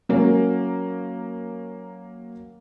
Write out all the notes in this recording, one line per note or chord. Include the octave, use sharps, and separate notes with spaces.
F#3 A#3 C#4